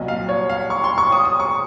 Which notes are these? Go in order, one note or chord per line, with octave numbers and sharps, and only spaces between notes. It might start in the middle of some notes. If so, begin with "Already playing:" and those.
Already playing: C2 A#2 F#3 D#5
F5
C#5
F5
C#6
C6
C#6
D#6
D#6
C#6